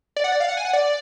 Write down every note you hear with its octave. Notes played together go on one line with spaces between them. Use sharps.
D5
F#5
D5
F5
F#5
G#5
F#5
D5